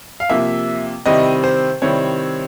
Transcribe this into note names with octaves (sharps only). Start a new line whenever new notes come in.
F5
C3 F3 A#3 E5
C3 D#3 G3 C4 E4 D#5
C5
C3 D#3 G3 C4 E4 C#5